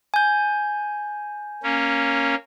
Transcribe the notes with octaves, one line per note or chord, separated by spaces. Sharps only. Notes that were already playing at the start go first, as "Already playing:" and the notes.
G#5 G6
A#3 C#4